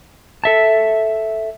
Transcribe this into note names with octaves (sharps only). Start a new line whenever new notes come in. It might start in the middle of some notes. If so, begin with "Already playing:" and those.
A4 E5 A5